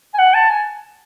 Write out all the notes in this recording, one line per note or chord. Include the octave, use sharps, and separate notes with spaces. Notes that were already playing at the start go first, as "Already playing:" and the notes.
G#5
F#5
A5
G#5